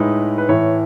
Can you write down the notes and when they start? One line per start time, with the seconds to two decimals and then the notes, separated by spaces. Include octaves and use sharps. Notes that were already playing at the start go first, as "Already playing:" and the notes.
Already playing: A2 G#3 D#4 B4
0.38 B4
0.49 A2 E3 A3 C#5